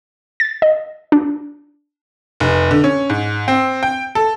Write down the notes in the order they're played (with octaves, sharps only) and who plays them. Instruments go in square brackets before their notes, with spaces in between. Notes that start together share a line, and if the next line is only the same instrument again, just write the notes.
[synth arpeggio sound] A6
D#5
D4
[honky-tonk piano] F1
D3
C#4
G#2
C4
G5
A4